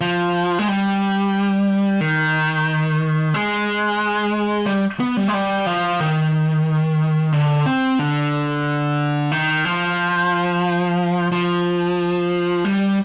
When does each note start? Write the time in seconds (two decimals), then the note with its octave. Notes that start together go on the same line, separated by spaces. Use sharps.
0.01 F3
0.59 G#3
0.68 G3
2.01 D#3
3.34 G#3
4.66 G3
5.00 B3
5.17 G3
5.28 G#3
5.33 G3
5.66 F3
6.00 D#3
7.33 D3
7.66 C4
7.99 D3
9.31 D#3
9.65 F3
11.32 F3
12.65 G3